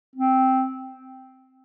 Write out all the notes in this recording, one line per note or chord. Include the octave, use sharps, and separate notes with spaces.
C4